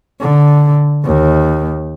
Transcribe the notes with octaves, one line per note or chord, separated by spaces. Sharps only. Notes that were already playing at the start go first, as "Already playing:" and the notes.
D3
D#2